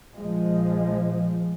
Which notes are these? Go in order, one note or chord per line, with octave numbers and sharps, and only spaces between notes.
A#1 F3 G#3